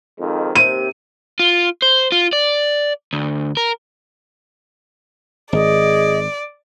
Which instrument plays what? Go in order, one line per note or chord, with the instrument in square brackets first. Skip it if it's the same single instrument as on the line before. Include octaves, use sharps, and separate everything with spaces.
[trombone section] F2 G#2 D#3
[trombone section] D#2 C3 [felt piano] D#7
[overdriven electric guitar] F4
C5
F4
D5
D2
A#4
[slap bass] G#1 [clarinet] G#4 [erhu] D5 [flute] D#5